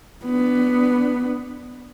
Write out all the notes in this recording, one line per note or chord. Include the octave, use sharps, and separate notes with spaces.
B3 D4